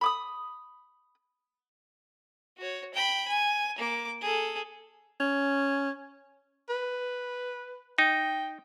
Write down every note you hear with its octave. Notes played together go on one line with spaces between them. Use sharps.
B5 D6 D#6
F#4 C#5
G5 B5
G#5
A#3 D6
G#4 A4
C#4
B4
D#4 G5